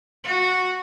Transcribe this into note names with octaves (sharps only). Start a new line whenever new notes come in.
F#4